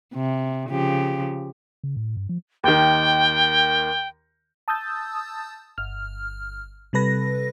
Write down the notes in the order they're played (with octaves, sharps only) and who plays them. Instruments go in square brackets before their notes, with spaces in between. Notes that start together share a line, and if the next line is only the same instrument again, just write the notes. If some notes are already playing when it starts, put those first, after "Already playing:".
[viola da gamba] C3
C#3 F3 G4
[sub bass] C#3
A2
G2
F3
[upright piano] D#2 D#3 [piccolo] G5
[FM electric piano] A5 D#6 E6 G6 A6
G1 F6
C3 G3 A4 B4 A#6